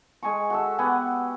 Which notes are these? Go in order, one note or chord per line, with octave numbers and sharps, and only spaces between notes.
G#3 G#5 A#5 C#6
F#4 A4 E5
B3 G4 F#5 G#5